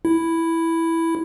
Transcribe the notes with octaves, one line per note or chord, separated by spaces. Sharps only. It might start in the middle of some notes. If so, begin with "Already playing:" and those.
E4